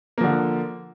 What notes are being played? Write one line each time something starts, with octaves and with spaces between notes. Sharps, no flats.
D3 F3 A#3